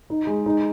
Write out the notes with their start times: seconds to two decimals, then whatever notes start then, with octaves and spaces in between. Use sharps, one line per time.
0.10 D#4
0.27 G#3
0.46 D#4